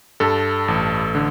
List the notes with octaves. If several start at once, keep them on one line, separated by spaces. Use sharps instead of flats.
G2 A4
A1
D3